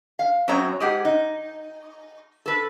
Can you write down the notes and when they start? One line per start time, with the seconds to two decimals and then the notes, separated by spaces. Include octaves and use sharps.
0.19 F5
0.48 F#2 F#3 C4 C#5 A#5
0.80 G#2 G4 G#4 F#5
1.05 D#4
2.46 A4 B4